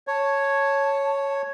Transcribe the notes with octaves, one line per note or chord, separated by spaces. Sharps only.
C#5 A5